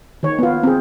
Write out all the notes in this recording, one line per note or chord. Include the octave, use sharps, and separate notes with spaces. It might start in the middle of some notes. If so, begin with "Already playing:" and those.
D#3 C#5
B3 F4
C4 G#4